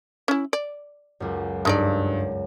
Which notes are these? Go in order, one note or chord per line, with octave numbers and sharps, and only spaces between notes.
C#4 E4
D5
C#2 F#2
G2 G#3 D#4 D5